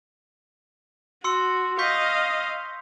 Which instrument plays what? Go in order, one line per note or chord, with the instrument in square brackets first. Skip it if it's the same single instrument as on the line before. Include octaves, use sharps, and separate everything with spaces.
[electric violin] F#4 [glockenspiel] C6 E6 C#7
[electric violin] D#5 F5 [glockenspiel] C#6 G6 B6